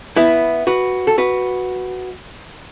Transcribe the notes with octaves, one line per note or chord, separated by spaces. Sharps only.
B3 E4
F#4 B4
A4
F#4 B4